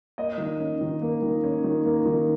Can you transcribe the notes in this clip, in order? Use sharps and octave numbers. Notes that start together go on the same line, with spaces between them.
A#3 D#5
D#3
C#4
D#3
A#3
D#3
C#4
D#3
A#3
D#3